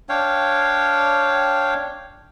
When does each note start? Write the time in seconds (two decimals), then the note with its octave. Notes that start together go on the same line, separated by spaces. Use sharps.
0.09 D4 C#5 F5 G5